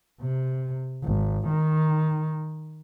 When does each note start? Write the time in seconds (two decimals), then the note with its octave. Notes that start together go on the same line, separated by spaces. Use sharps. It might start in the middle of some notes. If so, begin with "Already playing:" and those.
0.22 C3
1.04 G#1
1.48 D#3